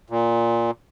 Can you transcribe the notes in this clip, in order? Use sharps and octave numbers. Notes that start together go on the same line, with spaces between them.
A#2